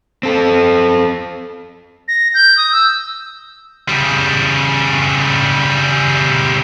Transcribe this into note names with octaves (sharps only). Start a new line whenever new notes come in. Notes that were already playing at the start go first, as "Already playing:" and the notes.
C4 A4
A#6
G6
D#6
E6
C#3 G3